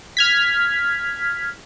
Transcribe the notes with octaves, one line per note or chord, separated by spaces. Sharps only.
F6 G#6 B6